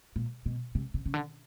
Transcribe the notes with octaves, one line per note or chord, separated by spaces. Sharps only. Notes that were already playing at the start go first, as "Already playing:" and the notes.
A#2
B2
C3
C3
C#3
D3